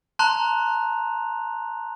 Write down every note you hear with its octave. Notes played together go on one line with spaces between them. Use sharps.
A5 A#5 C6 F#6 F7